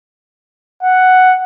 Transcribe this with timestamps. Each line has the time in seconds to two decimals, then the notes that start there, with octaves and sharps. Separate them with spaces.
0.83 F#5